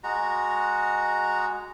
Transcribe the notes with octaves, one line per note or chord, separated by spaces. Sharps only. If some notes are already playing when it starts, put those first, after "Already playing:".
G#3 F#4 A#5